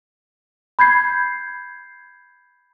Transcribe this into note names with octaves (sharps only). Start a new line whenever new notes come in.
B5 G6 G#6 C7